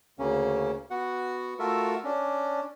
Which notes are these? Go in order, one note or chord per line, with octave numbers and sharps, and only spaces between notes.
D2 C#3 A#3 C#4
B3 F#4 F#5
A3 F4 F#4 A4 A#4 E5
C#4 D4